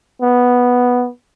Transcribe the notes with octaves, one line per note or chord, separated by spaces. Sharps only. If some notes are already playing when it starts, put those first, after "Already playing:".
B3